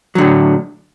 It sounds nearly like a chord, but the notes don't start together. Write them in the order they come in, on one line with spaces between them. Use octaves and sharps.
F#3 D3 A2